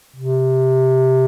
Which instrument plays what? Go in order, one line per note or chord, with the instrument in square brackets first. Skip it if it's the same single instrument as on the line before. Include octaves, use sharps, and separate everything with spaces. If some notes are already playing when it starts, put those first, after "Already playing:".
[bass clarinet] C3